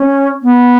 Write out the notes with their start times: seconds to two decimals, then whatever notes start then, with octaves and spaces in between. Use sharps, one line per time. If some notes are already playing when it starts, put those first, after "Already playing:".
Already playing: C#4
0.43 B3